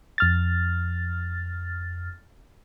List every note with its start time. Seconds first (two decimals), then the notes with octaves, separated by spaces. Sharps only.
0.18 F2 F6 A6